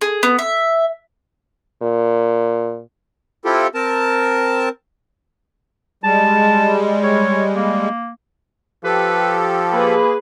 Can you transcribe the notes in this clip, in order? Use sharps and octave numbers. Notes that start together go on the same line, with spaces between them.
G#4
B3
E5
A#2
C4 E4 F4 G4 A4
C4 A#4 A5
G3 G#3 A5
C#5
A#3
F3 G4 A4 B4
A#3 G#4 B4